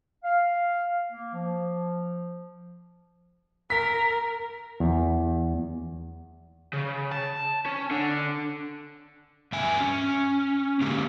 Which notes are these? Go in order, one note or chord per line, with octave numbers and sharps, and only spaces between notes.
F5
A#3
F3
A#4 B6
E2
C#3
A5
C#4
D3
G2 E5 G#5
C#4
D3 G#3 A#3 G4